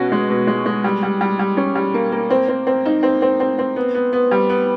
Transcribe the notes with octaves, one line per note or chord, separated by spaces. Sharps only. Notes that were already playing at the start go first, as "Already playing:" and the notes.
Already playing: B2 C#4 F#4
G#3
B2
G#3
G#3
G3
G3
G3
G3
C#4
G3
A#3
A#3
C4
C4
C4
D#4
C4
C4
C4
C4
B3
B3
B3
G3
B3